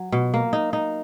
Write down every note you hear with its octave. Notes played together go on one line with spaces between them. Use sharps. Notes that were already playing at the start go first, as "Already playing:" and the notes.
Already playing: F#3
B2
A#3
D#4
D#4